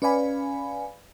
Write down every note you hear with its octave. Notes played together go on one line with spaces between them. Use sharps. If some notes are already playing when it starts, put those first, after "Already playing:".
C#4 B4 D5 F5 G#5 B5